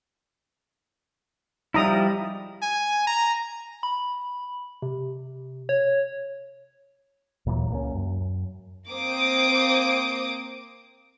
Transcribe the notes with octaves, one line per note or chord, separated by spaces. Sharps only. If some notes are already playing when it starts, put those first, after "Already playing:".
F3 G3 D#4 E4 A#5 D#6
G#5
A#5
B5
C3
C#5
D#2 A#2 E3 F#3
C#2 A#3 C#4
F#2
A#3 C4 C5 D6 D#6 D7